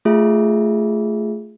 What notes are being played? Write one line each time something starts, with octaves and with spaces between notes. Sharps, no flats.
A3 F4 G#4 E5